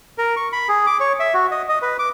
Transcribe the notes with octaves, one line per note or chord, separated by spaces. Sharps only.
A#4
C#6
B5
G#4
D6
C#5
E5
F#4
D#5
D#5
B4
D6